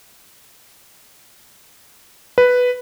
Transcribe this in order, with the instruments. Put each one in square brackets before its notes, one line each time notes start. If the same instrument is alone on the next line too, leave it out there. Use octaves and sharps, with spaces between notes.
[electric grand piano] B4